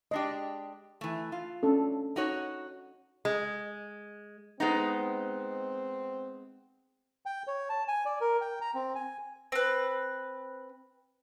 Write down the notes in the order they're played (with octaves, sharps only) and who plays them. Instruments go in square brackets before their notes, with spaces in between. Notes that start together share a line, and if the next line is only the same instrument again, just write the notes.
[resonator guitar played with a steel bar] G#3 D4 G4 [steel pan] D#5
[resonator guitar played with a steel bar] E3 A3
F4
[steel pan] C#4 D4 A4
[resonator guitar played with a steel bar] D#4 F#4 C#5
G#3
[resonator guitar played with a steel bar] G#3 B3 D#4 [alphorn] C4
[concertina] G5
C#5
A5
G#5
D5
A#4
G5
A#5
C4
G#5
[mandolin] C4 B4